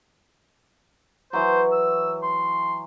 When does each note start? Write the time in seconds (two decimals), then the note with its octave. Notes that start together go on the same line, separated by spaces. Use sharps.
1.33 E3 F#3 C5
1.72 E6
2.23 C6